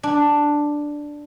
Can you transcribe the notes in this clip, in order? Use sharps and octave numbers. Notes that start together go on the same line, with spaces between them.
D4